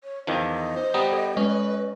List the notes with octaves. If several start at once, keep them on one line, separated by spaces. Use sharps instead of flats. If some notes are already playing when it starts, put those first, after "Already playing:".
C#5
E2 D#3 F3 D#5
C5
G3 B3 A#5 D#6
A4
G#3 C#4 B4